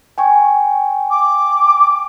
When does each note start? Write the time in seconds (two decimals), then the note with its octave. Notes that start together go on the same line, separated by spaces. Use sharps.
0.18 G5 G#5 C#6
1.10 D6